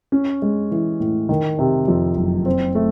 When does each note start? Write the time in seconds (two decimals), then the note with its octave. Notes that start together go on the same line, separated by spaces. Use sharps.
0.12 C#4
0.42 G#3
0.71 E3
1.00 A2
1.29 D#3
1.59 C3
1.88 F2
2.17 F#1
2.46 C4
2.75 A3